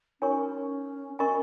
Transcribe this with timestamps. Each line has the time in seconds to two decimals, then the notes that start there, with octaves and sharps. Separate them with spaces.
0.21 C#4 D#4 A#4 C#5 G#5 C#6
1.19 C#4 A#4 D#5 G#5 C#6